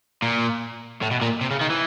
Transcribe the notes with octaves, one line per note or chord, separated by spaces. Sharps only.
A#2
A2
B2
A#2
C3
C#3
D#3
E3